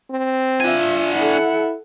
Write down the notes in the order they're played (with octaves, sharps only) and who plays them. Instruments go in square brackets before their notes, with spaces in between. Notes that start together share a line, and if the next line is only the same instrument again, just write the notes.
[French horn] C4
[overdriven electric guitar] D4 G#5 [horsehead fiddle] F4 E5
[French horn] E4 [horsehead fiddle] A4 F#5